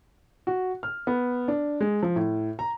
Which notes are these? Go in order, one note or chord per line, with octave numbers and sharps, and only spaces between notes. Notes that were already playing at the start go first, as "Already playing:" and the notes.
F#4
F6
B3
D4
G#3
F3
A2
A#5